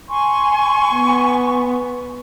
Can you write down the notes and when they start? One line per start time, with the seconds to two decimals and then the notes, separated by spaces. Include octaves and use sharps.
0.10 G#5 C6 C#6
0.94 B3